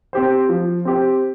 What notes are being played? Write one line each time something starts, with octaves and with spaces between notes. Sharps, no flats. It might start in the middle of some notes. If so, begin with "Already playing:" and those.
C4 G4 C5
F3
C4 G4 C5